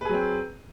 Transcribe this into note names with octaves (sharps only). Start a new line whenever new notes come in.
F#3 C4 G#4 B4